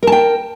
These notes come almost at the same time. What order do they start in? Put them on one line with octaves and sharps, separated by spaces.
A#4 A5 G5